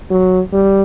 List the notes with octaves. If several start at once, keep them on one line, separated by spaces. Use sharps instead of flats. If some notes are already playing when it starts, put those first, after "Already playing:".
F#3
G3